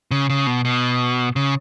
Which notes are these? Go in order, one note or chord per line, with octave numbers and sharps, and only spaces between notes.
C#3
C#3
B2
B2
C#3